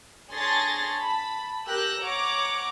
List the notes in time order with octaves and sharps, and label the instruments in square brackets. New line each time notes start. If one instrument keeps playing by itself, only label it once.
[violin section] D4 G#4 C#5 C6 A6 A#6
A5 B5
G4 A#4 E6 F#6 G6 A#6
C#5 F#5 A#5 D6